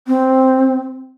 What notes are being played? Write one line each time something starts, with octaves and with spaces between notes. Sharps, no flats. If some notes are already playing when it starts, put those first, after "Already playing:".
C4